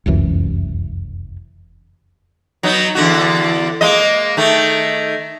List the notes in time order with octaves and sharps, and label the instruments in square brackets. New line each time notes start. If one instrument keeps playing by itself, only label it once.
[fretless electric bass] F1 C#2 F#2 E3
[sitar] F#3 B3 D#4
E2 D3 F#4
G#3 A#3 D#5
D#3 A3